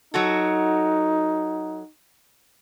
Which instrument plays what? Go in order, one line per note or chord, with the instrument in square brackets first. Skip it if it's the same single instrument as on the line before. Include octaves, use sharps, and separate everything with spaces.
[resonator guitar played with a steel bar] F#3 F#4 A4 [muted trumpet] D#4